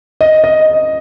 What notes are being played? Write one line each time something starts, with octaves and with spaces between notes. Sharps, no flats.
D#5
D#5